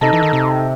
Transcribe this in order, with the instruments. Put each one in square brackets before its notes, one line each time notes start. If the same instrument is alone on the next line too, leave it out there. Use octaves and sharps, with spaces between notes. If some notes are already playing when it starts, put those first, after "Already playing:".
[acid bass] C3 [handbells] D#4 A4 D#5 A5
[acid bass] E3
D#3
C3